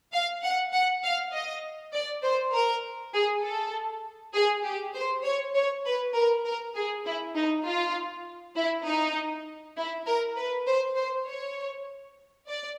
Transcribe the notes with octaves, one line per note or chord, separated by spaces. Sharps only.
F5
F#5
F#5
F5
D#5
D5
C5
A#4
G#4
A4
G#4
G4
C5
C#5
C#5
B4
A#4
A#4
G#4
E4
D#4
F4
E4
D#4
E4
A#4
B4
C5
C5
C#5
D5